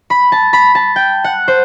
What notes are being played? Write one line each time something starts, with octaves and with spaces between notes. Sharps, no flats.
B5
A5
B5
A5
G5
F#5
C5